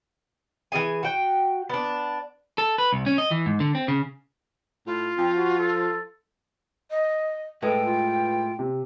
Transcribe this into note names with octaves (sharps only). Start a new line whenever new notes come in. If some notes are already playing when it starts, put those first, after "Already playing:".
E3 D4 G#4 G#5
F#4 G5
B3 D4
A4
B4
C2
C#4
D#5
E3
G#2
D3
C4
C#3
A2 F4
F3 C4
F#4
A4
D#5
A2 G#3 A4 B4 G5
F4
C3